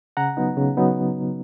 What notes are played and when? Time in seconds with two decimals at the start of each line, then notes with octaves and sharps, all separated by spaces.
0.17 C#3 F#5 A#5
0.37 F#3 B3 D#4
0.57 C#3
0.77 F#3 B3 D#4